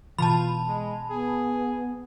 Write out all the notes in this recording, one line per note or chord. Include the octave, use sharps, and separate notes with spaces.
B2 E3 F4 A5 B5
G#3
B3 G#4